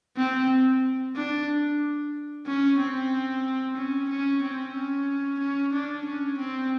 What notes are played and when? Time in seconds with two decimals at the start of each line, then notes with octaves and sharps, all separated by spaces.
0.17 C4
1.16 D4
2.46 C#4
2.79 C4
3.77 C#4
4.09 C#4
4.42 C4
4.75 C#4
5.40 C#4
5.73 D4
6.05 C#4
6.38 C4